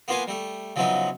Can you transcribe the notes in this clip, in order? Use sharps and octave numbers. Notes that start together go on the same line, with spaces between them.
A#3 B3 F4 B4 F5 G#5
G3 A3
C#3 F3 F#3 B3 D#4 E4